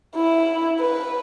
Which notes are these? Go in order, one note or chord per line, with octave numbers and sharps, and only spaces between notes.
E4
B4